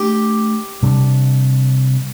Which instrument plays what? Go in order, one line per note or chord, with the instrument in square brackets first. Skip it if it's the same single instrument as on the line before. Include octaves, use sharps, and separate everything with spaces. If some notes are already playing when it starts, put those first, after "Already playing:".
Already playing: [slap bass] A3 D4 [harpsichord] G4
[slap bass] C3 G3 D4